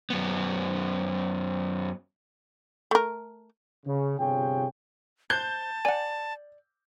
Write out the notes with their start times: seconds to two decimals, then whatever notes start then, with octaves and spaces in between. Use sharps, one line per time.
0.10 F#2 B3
2.91 A3 A#4
3.86 C#3
4.18 G1 C3 F4 G#4 C#5 G5
5.30 C5 A5 F#6 G6
5.85 D5 F#5 G#5